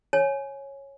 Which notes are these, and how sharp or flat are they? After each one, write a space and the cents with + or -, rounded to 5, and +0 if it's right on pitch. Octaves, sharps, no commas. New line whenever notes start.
C#5 -10 G#5 +15